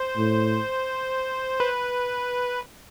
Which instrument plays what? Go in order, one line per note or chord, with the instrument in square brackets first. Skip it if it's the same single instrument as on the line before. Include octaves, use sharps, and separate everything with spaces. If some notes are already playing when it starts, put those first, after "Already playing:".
Already playing: [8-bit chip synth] C5
[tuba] A2
[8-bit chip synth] B4